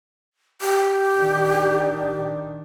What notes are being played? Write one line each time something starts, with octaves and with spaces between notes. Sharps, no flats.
G4
D#3 D4